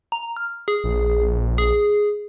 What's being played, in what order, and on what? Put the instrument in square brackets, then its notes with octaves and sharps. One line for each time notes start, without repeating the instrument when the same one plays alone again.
[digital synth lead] A#5
F6
G#4
[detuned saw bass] A#1
[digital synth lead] G#4